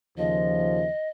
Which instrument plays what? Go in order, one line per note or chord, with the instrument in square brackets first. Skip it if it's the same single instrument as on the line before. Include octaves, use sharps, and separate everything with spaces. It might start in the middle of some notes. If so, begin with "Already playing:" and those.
[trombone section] D#2 C#3 F3 [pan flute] D#5